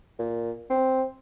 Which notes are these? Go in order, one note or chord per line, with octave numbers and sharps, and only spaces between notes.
A#2
C4